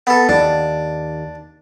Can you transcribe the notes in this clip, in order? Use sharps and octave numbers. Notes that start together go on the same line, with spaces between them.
B3 A4
D#2 D4